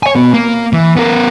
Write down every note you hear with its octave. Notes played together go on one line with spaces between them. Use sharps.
C#5 G#5
B2 B3
A#3
E3
B3 A#4